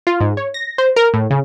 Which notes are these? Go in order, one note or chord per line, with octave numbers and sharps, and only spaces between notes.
F4
G#2
C#5
A#6
C5
A#4
A2
C#3